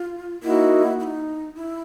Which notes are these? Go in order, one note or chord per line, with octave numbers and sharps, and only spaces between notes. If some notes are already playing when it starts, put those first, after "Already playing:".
Already playing: F4
A#3 D#4 E4 F#4
E4
D#4
E4